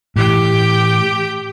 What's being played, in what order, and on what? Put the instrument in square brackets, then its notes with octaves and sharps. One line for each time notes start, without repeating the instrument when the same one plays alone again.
[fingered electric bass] A2 E3 [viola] G4 G5